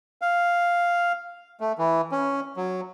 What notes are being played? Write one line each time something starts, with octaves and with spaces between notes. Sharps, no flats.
F5
A3
E3
C#4
F#3